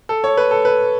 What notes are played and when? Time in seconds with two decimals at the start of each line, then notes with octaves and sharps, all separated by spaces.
0.09 A4
0.24 C#5
0.37 B4
0.51 A4
0.65 B4